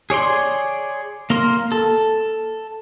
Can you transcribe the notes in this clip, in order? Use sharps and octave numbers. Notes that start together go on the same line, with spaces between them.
G#4 C#5 D5 C6
A#3 A#4 C6
A4